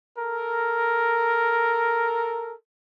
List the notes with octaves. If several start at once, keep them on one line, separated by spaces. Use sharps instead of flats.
A4 A#4